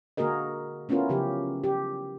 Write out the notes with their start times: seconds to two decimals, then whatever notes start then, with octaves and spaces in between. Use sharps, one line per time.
0.17 D3 A#3 F#4 G#4 A#4 D#5
0.89 A3 B3 C#4 E4 F4 A#4
1.09 C#3 F3 F#3 G4
1.64 G4